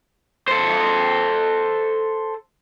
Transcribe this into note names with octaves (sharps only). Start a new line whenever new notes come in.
A4 C5